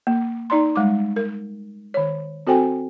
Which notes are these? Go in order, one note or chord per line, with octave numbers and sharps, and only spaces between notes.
A#3
D#4 D5 A#5 C6
G3 G#3 D6
A#4
D#3 C#5
C4 F#4 A4 C5 G5 G#5